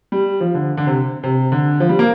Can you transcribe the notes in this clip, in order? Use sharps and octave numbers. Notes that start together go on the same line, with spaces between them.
G3
F3
D3
D3
C3
C3
D3
F3
G3
A#3